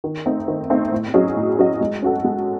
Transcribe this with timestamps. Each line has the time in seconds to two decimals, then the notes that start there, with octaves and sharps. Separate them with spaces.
0.04 D#3
0.26 A3 C4 D#4
0.48 D#3
0.70 A3 C4 D#4
0.92 A2
1.14 F#3 C#4 G#4 D#5
1.36 A2
1.59 F#3 C#4 G#4 D#5
1.81 G#3
2.02 C#4 F#4 A4
2.25 G#3